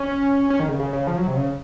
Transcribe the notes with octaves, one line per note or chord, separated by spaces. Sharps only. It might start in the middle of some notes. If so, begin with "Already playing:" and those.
Already playing: C#4
C#4
D#3
C#3
C#3
C#3
F3
F#3
C3
C#3